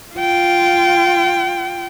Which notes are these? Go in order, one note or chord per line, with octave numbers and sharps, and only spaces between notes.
F4 G5